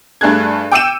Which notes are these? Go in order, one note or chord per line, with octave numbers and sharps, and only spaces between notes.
G2 A3 D4 G#4 F#6 G#6
G5 D6 E6 C#7 D#7 E7